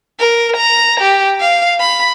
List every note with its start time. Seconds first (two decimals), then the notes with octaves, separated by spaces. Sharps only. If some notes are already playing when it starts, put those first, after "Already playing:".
0.19 A#4
0.56 A#5
1.00 G4
1.40 F5
1.80 B5